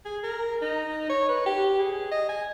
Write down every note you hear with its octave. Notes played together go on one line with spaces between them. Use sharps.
G#4
A#4
D#4
C#5
B4
G4
G#4
D#5
G#5